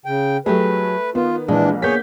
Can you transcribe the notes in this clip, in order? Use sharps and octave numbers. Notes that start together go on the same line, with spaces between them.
C#3 G5
F#3 A3 G4 G#4 B4
D#3 B3 F4
A#1 E3 G#3 D4
A#3 B3 G#4 C#5 G6 B6